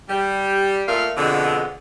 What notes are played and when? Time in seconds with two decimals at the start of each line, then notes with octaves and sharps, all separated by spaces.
0.09 G3
0.88 A#2 A3 A#3 F5
1.17 F2 B2 D3 G#3